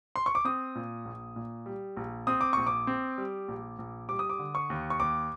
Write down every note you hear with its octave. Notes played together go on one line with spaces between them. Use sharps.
C6
C#6
D6
C4 D#6
A#2
A#1
A#2
G3
A#1
C4 D#6
D6
A#1 C#6
D6
C4
G3
A#1
A#1
G3 D6
D#6
D6
D3
C#6
D#2
C#6
D#2 D6